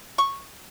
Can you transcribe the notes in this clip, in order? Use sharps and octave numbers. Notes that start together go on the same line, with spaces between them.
C#6